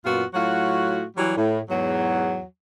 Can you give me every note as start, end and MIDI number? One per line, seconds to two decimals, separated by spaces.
0.05 0.23 42
0.05 0.23 46
0.05 0.23 59
0.05 0.23 65
0.05 0.23 66
0.34 1.03 45
0.34 1.03 54
0.34 1.03 65
0.34 1.03 66
1.17 1.34 52
1.17 1.34 54
1.17 1.34 55
1.37 1.59 45
1.69 2.43 40
1.69 2.43 44
1.69 2.43 54